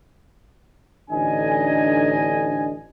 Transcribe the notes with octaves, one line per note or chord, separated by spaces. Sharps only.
A1 D3 D4 D#4 D#5 G#5